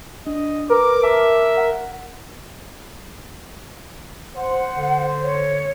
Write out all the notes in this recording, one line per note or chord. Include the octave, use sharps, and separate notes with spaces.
D4 D#5
A#4 B4 D6
E5 A5 D6
F#5
C5 F#5
D3
C#5